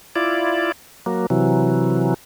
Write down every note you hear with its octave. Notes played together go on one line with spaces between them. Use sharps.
E4 F4 D5
F#3 A#3
C3 E3 F#3